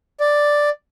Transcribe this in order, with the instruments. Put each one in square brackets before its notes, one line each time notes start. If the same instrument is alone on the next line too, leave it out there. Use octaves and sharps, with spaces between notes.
[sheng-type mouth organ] D5